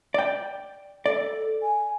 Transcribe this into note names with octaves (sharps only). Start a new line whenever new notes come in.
D5 G5
A4 D5
G#5